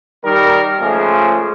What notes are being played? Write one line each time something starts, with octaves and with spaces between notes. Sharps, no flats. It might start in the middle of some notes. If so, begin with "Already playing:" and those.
D#3 G3 A#4
C#3 F3 G#3 A3 F4 G#4